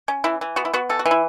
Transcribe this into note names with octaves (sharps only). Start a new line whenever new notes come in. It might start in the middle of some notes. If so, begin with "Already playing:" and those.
C#4
E3 E4
E3
B3 F#4
E4
B3 F#4
E3 A4
F#4
E3
E4